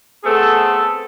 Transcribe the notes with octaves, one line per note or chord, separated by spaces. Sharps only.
A3 B3 C4 G#4 A4